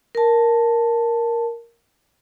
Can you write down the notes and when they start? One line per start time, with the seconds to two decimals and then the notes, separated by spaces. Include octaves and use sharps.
0.15 A#4 A5